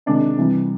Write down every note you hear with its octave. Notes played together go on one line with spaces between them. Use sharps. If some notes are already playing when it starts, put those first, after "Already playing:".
C3 D#3 G#3 D4
C3 E3 G3